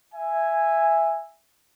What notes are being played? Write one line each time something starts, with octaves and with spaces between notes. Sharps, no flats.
E5 G#5